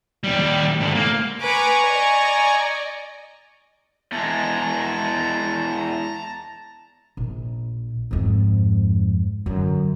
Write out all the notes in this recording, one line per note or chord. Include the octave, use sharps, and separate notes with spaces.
D#2 G3
G#2 D3
A#3
B4 G#5 A#5 C#6 D6
D5 D#5
E2 G#3 A5 A#5
A#1
F2 G#2
F#2 D3